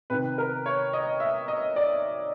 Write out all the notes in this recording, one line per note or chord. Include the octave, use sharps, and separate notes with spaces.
C3 D#3 B4
A#4
C#5
D#5
E5
D#5
D5